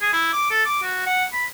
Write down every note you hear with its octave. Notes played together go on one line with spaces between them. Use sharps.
G#4
E4
D6
A4
D6
F#4
F#5
B5